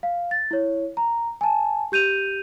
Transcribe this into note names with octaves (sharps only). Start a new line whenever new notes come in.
F5
A6
E4 C#5
A#5
G#5 A5
G4 G6 D#7 F7